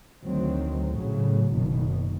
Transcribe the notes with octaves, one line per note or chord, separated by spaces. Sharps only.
D2 D#3 F#3 C4
A2 C#3 F#3
F#1 B2 D#3